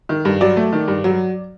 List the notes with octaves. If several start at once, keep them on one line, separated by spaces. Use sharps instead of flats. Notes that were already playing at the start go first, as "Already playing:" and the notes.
D#3
G2
F#3 D5
A3
D#3
G2
F#3